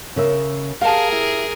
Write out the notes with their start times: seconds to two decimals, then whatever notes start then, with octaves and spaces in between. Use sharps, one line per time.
0.16 C#3 A#4 E5
0.81 G4 G#4 A#4 F5 A5
1.12 E4